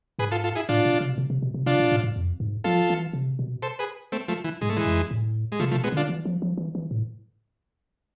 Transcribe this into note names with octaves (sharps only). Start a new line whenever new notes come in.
G#2 G#4 B4
F4 A4
F4 A4
E4 G#4
A2 D4 F4
B2
C3
B2
C3
C3
B2
C3
C3 D4 F4
B2
A2
G#2
F2
G#2
F3 F4 A4
E3
C3
B2
A4 C5
G#4 B4
A3 C4
F3 A3
E3
G#2 G#3
A3
E3 G#3
F2
A2
G#3
C3 F3 A3
F3 A3
B2
G#3 B3
D3 D4 F4
E3
F3
F3
E3
E3
A2